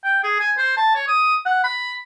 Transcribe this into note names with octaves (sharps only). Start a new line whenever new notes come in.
G5
G#4
G#5
C5
A5
C#5
D#6
F#5
B5